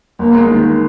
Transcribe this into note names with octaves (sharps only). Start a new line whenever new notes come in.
G1 A#3
G#3
D#3